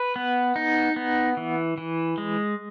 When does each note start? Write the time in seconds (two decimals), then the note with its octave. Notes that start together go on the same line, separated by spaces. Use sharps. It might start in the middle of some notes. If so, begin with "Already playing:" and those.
Already playing: B4
0.16 B3
0.56 D#4
0.96 B3
1.37 E3
1.78 E3
2.18 G#3